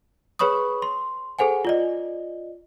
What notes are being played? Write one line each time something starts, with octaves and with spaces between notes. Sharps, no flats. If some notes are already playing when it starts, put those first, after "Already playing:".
G#4 B4 C#5 B5 C#6 D#6
C6
G#4 A4 C5 F#5 G#5
F4 D5 D#5